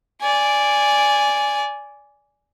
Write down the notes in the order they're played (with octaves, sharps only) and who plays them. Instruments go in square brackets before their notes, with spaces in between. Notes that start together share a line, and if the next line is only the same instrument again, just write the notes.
[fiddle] D5 G#5